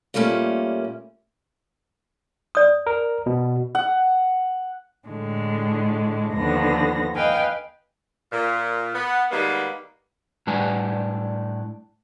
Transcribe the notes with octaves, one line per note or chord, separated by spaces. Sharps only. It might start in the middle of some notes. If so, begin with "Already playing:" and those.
A#2 G3 A3 A#3 C#4
D5 D#6
A#4
B2
F#5
A2 D3 G#3
D#2 D3 F3 B3 A#6
B4 D#5 F5 G5 G#5
A#2
B3
D#3 G3 G#3 A#3 B3
A2 G3 D4 B4 F#5 G#5